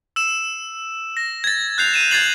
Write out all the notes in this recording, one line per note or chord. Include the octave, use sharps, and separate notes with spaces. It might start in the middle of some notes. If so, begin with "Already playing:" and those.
E6 E7
A#6
G#6 A6
F#6 G6 C7 F7
D#7 E7
G#6 A6 C7 F#7